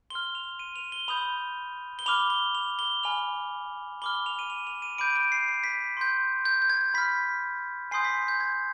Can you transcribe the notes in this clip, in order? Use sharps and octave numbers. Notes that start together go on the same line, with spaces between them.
C6 F6 G7
F7
D#7
F7
G7
B5 D#6 G6 F7
G7
B5 D6 F6 F7
G7
F7
G7
G#5 B5 F6 F7
B5 D6 F6 G7
F7
D#7
F7
F7
D#7
B5 D6 G6 D7
D7
C7
C7
B6
C6 G6
G6
G6
G#6
B5 F6 B6
G#5 C6 D#6 G6 C7
B6
G6
G#6